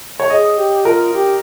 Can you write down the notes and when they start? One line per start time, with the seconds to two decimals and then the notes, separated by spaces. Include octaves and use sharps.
0.20 C#5
0.30 G#4 D#5
0.57 G4
0.85 F4 A#4
1.14 G4